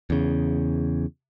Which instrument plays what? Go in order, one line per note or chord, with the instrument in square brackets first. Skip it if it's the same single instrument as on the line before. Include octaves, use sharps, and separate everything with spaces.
[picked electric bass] E2 C#3